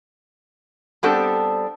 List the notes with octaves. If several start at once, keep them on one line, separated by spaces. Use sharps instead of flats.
G3 B3 C4 D4 G4 A4